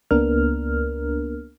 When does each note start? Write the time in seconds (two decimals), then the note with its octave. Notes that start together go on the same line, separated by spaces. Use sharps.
0.11 C#2 A#3 B3 D4 A#4 F6